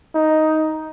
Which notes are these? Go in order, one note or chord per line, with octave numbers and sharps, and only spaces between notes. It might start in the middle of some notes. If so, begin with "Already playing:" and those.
D#4